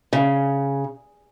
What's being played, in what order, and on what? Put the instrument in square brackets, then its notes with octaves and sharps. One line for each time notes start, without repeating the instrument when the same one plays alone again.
[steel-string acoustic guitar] C#3